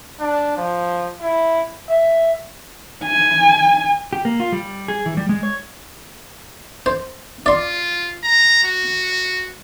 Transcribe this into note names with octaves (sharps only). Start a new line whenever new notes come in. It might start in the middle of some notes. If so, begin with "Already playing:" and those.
D4
F3
E4
E5
G#5
G4
A#3
F4
G3
G#4
E3
G3
G#3
C#5
C5
F4 D5 C6
A#5
F#4